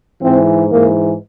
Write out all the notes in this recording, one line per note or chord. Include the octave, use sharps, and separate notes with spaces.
G#2 E3 C4
G#2 E3 A#3